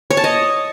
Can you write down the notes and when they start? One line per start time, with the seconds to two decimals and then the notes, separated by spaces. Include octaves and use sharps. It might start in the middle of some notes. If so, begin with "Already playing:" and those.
0.10 C#5
0.17 A5
0.24 D#5